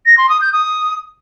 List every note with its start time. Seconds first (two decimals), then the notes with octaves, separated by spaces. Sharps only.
0.06 A#6
0.18 C6
0.29 D#6
0.41 G6
0.53 D#6